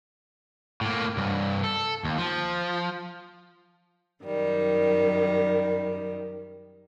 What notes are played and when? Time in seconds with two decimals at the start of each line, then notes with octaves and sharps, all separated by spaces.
0.81 A2 A#3
1.17 C2 G2
1.64 A4
2.04 D#2
2.18 F3
4.23 F#2 D#3 G3